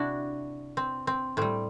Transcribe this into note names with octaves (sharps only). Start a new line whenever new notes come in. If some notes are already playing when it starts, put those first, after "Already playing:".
Already playing: C3 D4 E4 F#4
C4
C4
A2 G3 C4